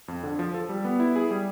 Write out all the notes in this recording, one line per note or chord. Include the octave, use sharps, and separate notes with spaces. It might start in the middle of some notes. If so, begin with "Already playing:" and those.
F2
D3
F3
A4
G3
B3
E4
G#4
G3